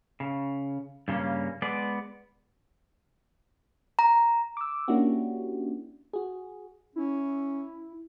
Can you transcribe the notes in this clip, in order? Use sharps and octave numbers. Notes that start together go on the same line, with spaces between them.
C#3
G2 C#3 G3 A#3 C#4
G#3 B3 D5
A#5
D6 E6
A#3 C#4 D4 E4 F#4 G4
F#4 G#4
C#4 E4